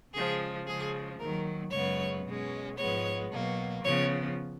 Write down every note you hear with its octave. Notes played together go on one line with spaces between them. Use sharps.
C#3 F3 G#3 G#4
C#3 F3 G#3 G#4
D#2 D#3 F#3 A#4
F#2 C#3 G#3 B3 C#5
B2 G#3 C#4
G#2 F3 G#3 B3 C#5
B2 F#3 A#3
C#3 F3 B3 C#5